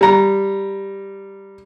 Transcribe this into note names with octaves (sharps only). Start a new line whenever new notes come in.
G3 A#5